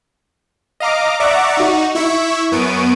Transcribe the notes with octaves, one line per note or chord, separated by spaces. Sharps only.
D#5 F5 A#5 D6
D5 E5 F#5 A#5 C#6 D6
D#4 F#4
E4 E5 C#6
F#2 B3 C#6 D7 D#7